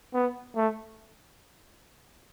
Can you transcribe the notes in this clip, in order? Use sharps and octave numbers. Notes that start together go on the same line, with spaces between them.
B3
A3